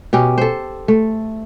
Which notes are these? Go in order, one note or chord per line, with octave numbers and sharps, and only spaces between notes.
B2 C#4 G4
A4 C5
A3